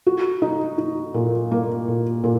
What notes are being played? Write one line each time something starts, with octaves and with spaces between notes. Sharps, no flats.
F#4
D#4
D#4
A#2
A#3
A#2
A#2